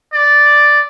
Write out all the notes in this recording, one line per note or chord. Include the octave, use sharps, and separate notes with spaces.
D5